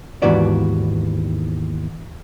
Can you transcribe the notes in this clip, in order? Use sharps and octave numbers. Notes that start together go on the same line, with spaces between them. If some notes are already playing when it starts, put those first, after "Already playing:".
D#2 G#2 E3 B3 F#4 D5